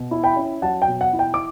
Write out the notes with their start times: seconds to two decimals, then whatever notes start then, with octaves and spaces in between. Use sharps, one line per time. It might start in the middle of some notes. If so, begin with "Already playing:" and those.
Already playing: B2
0.11 E4
0.24 G5 B5
0.36 C#4
0.62 F#3 F#5 A5
0.82 G5
0.88 B2
1.01 F#5
1.13 E4
1.19 G5
1.34 D6